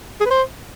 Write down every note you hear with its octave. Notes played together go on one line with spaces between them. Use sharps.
G#4
B4
C5